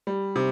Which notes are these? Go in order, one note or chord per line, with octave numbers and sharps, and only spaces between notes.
G3
C3